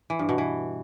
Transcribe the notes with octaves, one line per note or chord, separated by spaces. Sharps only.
E3
G2
B2
E3